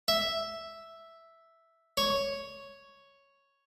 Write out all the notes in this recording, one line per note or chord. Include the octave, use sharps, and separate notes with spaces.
E5
C#5